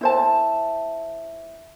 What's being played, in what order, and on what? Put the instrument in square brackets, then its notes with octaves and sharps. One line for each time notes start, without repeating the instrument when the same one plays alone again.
[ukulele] E4 C5 A5